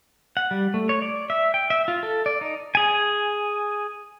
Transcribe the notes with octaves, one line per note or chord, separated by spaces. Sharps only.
F#5
G3
A3
C#5
D5
E5
G5
E5
F4
A4
D5
D#4
G#4 G#5